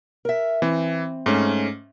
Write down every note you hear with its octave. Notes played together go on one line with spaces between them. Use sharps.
A#4 E5
E3 C4
G#2 A3 C#4